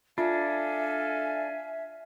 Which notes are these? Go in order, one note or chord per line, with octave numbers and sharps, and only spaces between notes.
D4 F4 A4 E5 F5 G#5